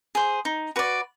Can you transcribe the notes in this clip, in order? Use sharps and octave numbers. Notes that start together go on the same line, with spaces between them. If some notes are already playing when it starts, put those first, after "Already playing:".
G#4 C5
D#4
F#4 B4 D5